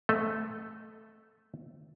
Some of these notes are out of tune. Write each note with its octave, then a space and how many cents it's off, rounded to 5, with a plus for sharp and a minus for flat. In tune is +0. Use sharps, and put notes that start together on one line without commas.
A3 +0 A4 +0 D#5 +0